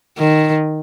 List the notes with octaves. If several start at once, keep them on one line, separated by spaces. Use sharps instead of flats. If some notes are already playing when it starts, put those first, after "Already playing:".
D#3